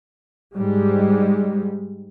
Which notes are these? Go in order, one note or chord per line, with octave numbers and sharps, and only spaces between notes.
G#2 G3 G#3